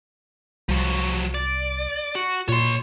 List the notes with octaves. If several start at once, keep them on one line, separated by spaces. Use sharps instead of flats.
C2 F3 F#3
D5
F#4
A#2 C#5 C6